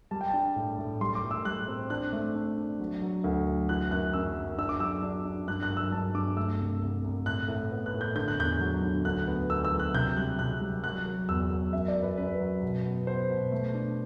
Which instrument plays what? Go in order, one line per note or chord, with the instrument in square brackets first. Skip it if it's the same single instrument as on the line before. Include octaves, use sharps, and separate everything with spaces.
[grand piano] G3 A5
G5
D4 A5
A2
A2
G3 C6
D6
A2
E6
G3 F#6
C4
D4 F#6
A3
D4
D4
F#3
F#3
D2
F#3
E3 F#6
F#2 F#6
F#2 E6
F#2
D4 E6
D6
F#3 E6
D4
D4
G2 F#6
F#6
F#3
E6
G2 A5
G2 D6
A3 E6
C2
C2
C2
A2 F#6
A2
B3
F#6
A2
G6
D3 G6
F#6
E2 G6
F#3
D3
D2 F#6
B3
D2 E6
E6
F#3
F#6
C3 G6
G3 F#6
C3 F#6
G3
F#3 F#6
F#3
E2 E6
F#3
F#2 E5
D5
F#2
B4
F#2 B4
F#3
B2
B3
B3 C5
B2
A3
D4